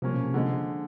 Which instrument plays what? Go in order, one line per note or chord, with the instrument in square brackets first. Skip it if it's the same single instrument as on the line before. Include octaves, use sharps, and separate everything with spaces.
[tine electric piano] C3 [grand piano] F3 A#3 C#4
[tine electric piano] B2
C3
[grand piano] D3 F3 G#3